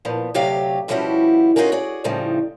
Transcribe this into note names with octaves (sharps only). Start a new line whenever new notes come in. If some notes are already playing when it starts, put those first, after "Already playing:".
A#2 F3 B3
D2 C3 F#3 G4 F5
B2 F3 G3 C#4 E4 F#4
C#4 D#4 F4 F#4 G#4 A#4
F#4 G#4 D5
D2 A2 C#3 F3 G3 D#4